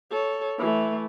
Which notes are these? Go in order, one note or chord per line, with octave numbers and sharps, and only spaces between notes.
A4 C#5
E3 A3